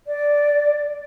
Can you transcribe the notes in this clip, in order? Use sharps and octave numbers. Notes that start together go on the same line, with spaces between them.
D5